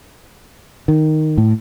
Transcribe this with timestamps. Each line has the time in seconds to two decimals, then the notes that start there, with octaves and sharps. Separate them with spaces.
0.88 D#3
1.38 A2